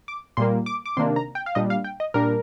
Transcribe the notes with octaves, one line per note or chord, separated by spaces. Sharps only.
D6
A#2 G3 A#3 C6
D6
D6
C3 D#3 A#3 D4 C6
A#5
G5
F5
A#2 G3 D4 D#5
F5
G5
D#5
A#2 G3 D4 A#4